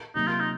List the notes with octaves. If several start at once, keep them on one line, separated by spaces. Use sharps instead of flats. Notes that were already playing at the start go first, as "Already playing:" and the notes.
C3 F#3 A#3 D#4
F4
D#4